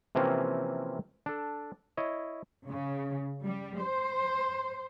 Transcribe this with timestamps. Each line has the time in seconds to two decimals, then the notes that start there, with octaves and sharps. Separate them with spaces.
0.15 C3 E3 F3 A#3 C4 C#4
1.26 D4 A4
1.97 E4 C#5 D#5
2.68 C#3
3.43 G3
3.77 C5